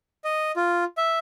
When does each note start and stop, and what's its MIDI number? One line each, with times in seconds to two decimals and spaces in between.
0.24 0.52 75
0.56 0.84 65
0.97 1.19 76